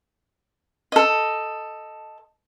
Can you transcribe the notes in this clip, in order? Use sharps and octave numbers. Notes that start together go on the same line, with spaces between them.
A4 D#5